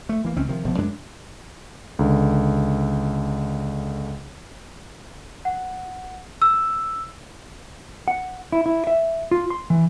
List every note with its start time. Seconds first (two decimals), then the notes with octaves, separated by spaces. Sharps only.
0.09 A3
0.24 E3 A#3
0.36 C#2 C4 C#4
0.48 C3 D#3 F3
0.64 F1 B2 F3
0.78 F#2 G#3 D4
1.99 C#2 D3
5.45 F#5
6.42 E6
8.08 F#5
8.52 E4
8.66 E4
8.87 E5
9.31 F4
9.50 C6
9.70 E3